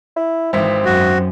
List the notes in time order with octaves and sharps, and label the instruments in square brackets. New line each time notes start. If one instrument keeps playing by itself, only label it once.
[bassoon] E4
[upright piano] G#1 E5 [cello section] E3 [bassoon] C4
[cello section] F#2 [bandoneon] F#4